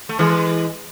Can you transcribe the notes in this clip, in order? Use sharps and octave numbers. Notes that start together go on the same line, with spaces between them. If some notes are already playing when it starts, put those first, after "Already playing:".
A3
E3 G#3